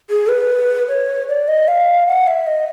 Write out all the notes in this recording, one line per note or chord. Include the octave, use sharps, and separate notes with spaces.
G#4
B4
C#5
D5
D#5
F5
F#5
E5
D#5